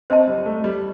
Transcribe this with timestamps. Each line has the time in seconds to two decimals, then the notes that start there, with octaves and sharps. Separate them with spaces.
0.10 C4 C5 D#5 A5
0.27 G3
0.38 G3
0.46 A3
0.64 G3